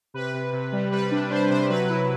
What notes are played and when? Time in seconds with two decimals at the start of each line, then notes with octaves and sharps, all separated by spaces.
0.14 C3 B4
0.34 C3
0.53 C3
0.72 G3
0.92 G3 B4
1.11 D4
1.31 D4 C5
1.50 C3 C5
1.70 F#3 B4
1.89 E4